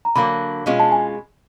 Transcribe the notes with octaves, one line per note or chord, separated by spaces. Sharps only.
A#5
D3 F#3 A#3 B5
B2 G#3 C#4 F4
A5
G#5